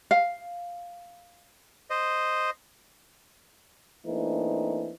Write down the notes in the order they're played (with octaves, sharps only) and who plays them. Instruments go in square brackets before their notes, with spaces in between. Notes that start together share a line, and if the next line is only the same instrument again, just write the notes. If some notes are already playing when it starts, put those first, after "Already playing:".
[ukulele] F5
[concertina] C5 D#5
[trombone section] E3 A3 A#3 C4 D4 D#4